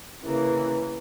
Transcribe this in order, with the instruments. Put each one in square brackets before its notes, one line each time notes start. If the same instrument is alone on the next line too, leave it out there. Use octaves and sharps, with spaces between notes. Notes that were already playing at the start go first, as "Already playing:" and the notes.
[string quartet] C#3 E3 A#3